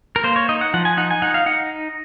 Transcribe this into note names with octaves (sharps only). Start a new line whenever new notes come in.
A#4
A#3 C5
C#5
D#4 D#5
F#5
F3 F#5
G#5
D#4 F#5
G#5
D#4 F#5
F5
D#4 F#5